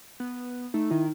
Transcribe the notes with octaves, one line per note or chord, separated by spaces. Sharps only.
B3
A3 D#4
D#3 E4